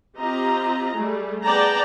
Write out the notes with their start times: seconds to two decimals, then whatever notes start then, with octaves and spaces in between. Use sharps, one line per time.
0.18 C4 F4 G4 D#5 A#5
0.93 G3 A3 G#4
1.43 B3 G#4 D5 G5 A5 A#5